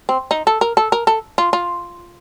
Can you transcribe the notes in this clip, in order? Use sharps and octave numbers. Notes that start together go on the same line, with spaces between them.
C4
D#4
A4
A#4
A4
A#4
A4
F4
F4